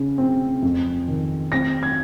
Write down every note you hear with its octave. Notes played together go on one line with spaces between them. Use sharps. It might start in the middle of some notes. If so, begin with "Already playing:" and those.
Already playing: C#3
C4
F2
D#3
C4 A#6
G#6